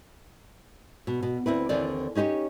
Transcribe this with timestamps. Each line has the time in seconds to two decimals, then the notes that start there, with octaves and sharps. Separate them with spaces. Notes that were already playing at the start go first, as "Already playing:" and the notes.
1.07 B2
1.23 B2
1.46 D2 C4 E4 B4
1.69 D#2 D3 E3 C4 D5
2.15 C#4 D#4 G4 C5 C#5